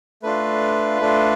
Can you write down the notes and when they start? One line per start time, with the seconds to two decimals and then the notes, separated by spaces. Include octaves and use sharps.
0.22 A3 D4 F4 B4
1.00 A3 D4 F4